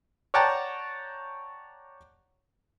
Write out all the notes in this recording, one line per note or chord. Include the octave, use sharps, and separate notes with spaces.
C#5 D5 F#5 G5 A5 A#5